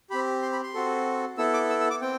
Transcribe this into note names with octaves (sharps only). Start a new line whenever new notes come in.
C4 G4 B5
C6
B5
C6
C4 F#4 A4
B3 E4 A4 E6
D6
E6
E6
D6
C4 G5